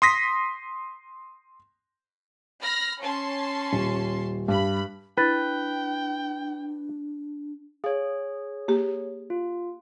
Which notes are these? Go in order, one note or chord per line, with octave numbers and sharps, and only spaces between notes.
C6 D#6 A#6 B6
B5 F6 A#6
C#4 A5 C6
D#1
G2 B5
D4 E4 B4 G5 A6
G#4 C#5 F5
A#3 G4
F4